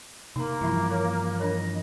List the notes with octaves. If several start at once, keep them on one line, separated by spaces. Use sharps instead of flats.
C3 A#3 D#4 A#5
G2 E3 F3 E4 E5 B5
A#4 C#5
D4 A#4 C#5 D#5